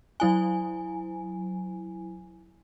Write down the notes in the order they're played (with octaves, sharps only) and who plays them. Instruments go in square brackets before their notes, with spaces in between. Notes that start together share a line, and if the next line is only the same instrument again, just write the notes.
[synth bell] F#3 E4 G#5